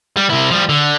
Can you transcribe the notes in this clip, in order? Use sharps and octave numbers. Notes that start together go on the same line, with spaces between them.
G3
C3 E4
F3 G3
D3